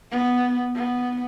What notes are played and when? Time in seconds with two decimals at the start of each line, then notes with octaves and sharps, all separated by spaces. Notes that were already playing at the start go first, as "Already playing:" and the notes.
0.11 B3
0.75 B3